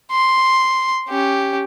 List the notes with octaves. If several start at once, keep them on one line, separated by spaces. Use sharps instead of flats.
C6
C#4 G4